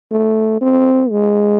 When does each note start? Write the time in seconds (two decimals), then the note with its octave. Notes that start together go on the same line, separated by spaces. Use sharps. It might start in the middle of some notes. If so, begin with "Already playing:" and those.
0.11 A3
0.61 C4
1.10 G#3